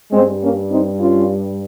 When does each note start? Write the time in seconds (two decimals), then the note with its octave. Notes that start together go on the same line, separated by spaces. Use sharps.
0.12 G2 G3 G#3 C4
0.41 A#3 C#4
0.70 C4 D#4
0.99 C#4 F4